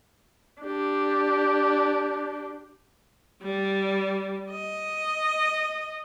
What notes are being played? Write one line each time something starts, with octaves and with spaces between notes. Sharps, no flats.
D4 G4
G3
D#5